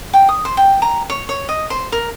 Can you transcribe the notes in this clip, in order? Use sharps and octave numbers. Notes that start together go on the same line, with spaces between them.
G5
D#6
C5
G5
A#5
C#5
C#5
D#5
C5
A#4